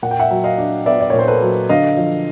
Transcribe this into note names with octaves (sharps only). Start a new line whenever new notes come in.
A#2 F#5
G5
E5 F#5
F#3
D#5 F5
D4
B3 D5 E5
D5
A#2 C#5
C5
A4 B4
F#3
D3 D#5 F5
F3